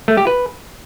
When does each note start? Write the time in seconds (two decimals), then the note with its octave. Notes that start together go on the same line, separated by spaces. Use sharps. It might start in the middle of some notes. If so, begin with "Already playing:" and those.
0.08 A3
0.17 G4
0.27 B4